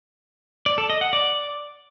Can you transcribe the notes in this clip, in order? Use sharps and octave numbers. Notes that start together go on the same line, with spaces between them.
D5
A4
D#5
F#5
D5